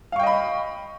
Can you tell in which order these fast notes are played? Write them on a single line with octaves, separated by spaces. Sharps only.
F5 C#6 G5 D#5 B5